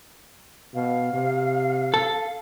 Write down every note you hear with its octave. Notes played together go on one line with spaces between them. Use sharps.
B2 F5
C3
A4